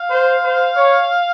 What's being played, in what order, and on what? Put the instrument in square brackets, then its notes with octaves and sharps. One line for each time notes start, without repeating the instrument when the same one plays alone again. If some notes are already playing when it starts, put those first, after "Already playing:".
Already playing: [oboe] F5
[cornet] C5
C5
C#5